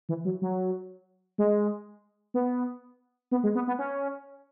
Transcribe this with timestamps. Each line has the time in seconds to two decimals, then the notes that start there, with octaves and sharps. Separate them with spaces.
0.09 E3
0.25 F#3
0.42 F#3
1.38 G#3
2.34 B3
3.31 B3
3.43 G#3
3.55 B3
3.67 B3
3.79 C#4